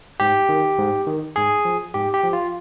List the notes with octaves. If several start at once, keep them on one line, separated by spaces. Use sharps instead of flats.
G#2 G4
D#3
G#2
D#3
G#2 G#4
F3
G#2 G4
G4
F3
F4